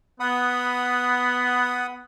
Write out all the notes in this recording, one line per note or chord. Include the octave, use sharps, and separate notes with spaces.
B3 F#5 B5 D#6